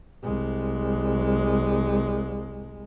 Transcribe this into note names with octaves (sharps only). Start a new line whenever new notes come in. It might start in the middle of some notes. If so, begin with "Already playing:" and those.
C2 G#3